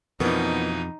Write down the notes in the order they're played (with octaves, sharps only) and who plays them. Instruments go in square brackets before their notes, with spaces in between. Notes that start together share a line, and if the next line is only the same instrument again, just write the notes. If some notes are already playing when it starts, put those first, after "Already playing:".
[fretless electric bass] F2 [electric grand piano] B2 E3 F3 [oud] A#3 B3 D4 [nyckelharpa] D#4